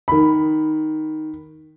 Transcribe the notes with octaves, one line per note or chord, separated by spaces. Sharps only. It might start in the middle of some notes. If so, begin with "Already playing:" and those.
D#3 B5